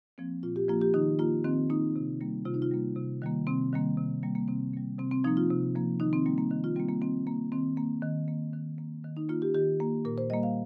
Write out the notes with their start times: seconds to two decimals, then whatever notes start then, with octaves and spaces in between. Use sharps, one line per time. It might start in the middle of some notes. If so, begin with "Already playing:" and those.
0.18 F3 A#3 C4
0.43 A#2 F4
0.56 G4
0.69 F3 A#3 F4
0.81 G4
0.94 D#3 D#4
1.19 A#3 F4
1.44 D#3 C4
1.70 A#3 D#4
1.96 C3
2.21 G3 A#3
2.45 C3 F4
2.54 D#4
2.62 F4
2.71 G3 A#3
2.96 C3
3.22 D#3 G3 A#3
3.47 C3 C4
3.73 D#3 G3 A#3
3.97 C3
4.23 G3 A#3
4.35 A#3
4.48 C3 C4
4.74 G3 A#3
4.99 C3 C4
5.11 C4
5.24 F3 A#3 D#4
5.37 F4
5.50 C3
5.75 F3 A#3
6.00 D#3 D#4
6.13 C4
6.26 G3 A#3
6.38 A#3
6.51 D#3
6.64 F4
6.76 G3 A#3 C4
6.89 A#3
7.01 D#3 C4
7.27 A#3
7.52 D#3 C4
7.77 A#3
8.02 D#3
8.28 A#3
8.53 D#3
8.78 A#3
9.04 D#3
9.17 D#4
9.29 A#3 F4
9.42 G4
9.54 D#3 G4
9.80 A#3
10.05 A#2 A#4
10.18 C5
10.30 G3 A#3 D#5
10.43 F5